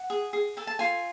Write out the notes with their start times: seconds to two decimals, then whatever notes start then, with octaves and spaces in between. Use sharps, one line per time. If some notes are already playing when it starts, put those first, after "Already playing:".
Already playing: F#5
0.10 G#4
0.33 G#4
0.57 A4 G#5
0.67 A5
0.79 F4 G#5